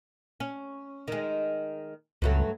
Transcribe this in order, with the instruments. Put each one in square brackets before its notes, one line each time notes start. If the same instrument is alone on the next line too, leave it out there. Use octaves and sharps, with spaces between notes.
[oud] C#4
D#3 G#3
[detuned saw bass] C#2 [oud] G2 F#3 A3